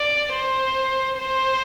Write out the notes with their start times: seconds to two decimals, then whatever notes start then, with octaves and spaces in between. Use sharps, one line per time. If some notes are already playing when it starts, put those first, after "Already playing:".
Already playing: D5
0.33 C5
1.17 C5